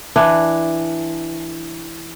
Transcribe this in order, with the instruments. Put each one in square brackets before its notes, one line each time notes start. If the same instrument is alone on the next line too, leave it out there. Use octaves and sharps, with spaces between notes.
[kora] E3 D4